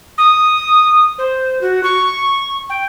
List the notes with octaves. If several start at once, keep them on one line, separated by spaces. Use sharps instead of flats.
D#6
C5
F#4
C#6
G5